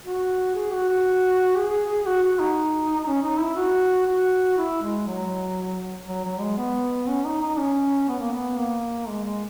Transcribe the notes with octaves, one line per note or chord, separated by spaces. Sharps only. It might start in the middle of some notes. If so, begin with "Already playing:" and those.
F#4
G#4
F#4
F#4
G#4
F#4
F#4
D#4
C#4
D#4
E4
F#4
F#4
E4
G#3
F#3
F#3
F#3
G#3
B3
C#4
D#4
D#4
C#4
B3
A#3
B3
A#3
G#3
G#3